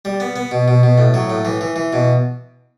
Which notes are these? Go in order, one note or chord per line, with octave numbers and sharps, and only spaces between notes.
G3
B3
B3
B2
B2
B2
A2
F#3
A2
E3
E3
E3
B2